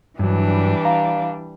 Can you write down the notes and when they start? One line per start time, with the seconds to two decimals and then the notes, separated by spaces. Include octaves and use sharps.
0.19 G2 E3 F#3 G3 D4
0.85 F5 A#5